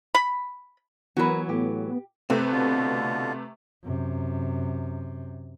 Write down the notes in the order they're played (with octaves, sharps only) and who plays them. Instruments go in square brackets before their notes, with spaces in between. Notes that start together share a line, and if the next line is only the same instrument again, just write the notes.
[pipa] B5
[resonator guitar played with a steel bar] E3 F#3 [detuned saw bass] B3 [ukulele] F#4 A#4 B4
[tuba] A2 [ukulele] G4
[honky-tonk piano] C3 A3 B4 [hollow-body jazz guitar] C4
[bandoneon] B2 D3 F4
[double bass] F#2 C3